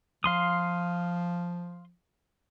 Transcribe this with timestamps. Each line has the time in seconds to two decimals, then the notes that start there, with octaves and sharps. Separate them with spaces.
0.24 F3 F5 C6 D#6